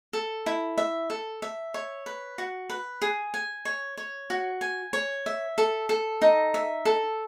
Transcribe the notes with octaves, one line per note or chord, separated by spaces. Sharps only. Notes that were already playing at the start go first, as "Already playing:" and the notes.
A4
E4
E5
A4
E5
C#5
B4
F#4
B4
G#4
G#5
C#5
C#5
F#4
G#5
C#5
E5
A4
A4
D#4
E5
A4